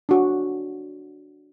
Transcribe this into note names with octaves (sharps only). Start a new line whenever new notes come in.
D4 F#4